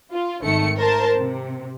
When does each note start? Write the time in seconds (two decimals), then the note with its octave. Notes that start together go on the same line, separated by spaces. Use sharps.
0.12 F4
0.43 G#1 D#3 A3 C#7
0.78 A#4 C5 A5
1.17 C3